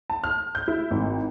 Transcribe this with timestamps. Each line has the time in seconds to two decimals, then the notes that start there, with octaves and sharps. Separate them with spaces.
0.10 A5
0.24 F6
0.55 G6
0.68 E4
0.91 G#1